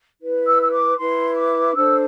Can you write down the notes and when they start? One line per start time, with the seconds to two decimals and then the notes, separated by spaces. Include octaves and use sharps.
0.21 E4 B4
0.47 E6
0.61 E6
0.72 D6
0.98 E4 B4 C6
1.36 D6
1.75 D4 A4 C5 E6